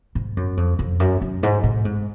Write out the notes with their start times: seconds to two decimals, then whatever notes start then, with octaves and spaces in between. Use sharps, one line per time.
0.15 G#2
0.37 F#2
0.57 F2
0.79 F2
1.00 F#2
1.21 F#2
1.43 G#2
1.64 A2
1.85 G#2